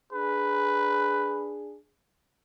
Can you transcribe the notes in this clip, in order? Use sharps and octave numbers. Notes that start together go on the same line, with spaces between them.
D4 G#4 B4